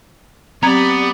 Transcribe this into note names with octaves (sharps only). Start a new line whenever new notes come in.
F#3 B3 C4 G4 D5 A#5 G#6